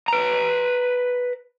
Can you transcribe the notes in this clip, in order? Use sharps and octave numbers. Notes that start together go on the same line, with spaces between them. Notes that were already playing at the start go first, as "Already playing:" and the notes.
B4 A#5